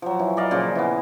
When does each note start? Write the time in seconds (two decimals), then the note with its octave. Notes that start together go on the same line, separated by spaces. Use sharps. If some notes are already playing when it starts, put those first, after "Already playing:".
0.02 F3 F#3
0.19 E3
0.37 F#3 D5 D#5 F5
0.51 A#2 C#3 F3
0.75 E3 B3